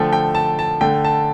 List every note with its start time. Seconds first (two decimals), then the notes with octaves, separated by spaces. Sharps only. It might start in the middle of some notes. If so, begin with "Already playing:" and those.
Already playing: D3 F3 A3 G5
0.13 G5
0.35 A5
0.59 A5
0.81 D3 A3 G5
1.05 A5